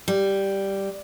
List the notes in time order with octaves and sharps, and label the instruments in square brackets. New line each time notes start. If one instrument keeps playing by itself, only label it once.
[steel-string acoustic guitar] G3